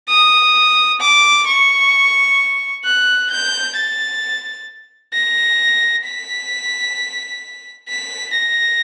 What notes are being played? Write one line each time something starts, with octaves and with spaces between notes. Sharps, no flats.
D#6
D6
C#6
F#6
G6
A6
A#6
B6
B6
A#6